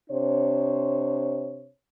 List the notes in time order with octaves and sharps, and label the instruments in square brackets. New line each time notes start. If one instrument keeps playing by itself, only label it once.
[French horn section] C3 D4 C5 C#5